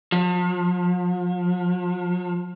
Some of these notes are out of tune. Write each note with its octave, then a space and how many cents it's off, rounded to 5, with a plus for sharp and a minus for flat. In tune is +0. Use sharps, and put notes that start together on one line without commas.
F3 +40